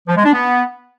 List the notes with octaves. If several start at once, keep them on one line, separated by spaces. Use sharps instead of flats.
F3
G#3
D4
B3